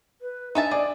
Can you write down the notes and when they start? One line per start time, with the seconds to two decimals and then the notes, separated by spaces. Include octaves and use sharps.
0.21 B4
0.55 D4 D#4 E5 G#5 A5
0.71 G#4 D5